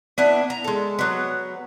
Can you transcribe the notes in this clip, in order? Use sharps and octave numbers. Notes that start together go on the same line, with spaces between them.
B3 D4 E4
A#5
G#3 A4
F#3 B3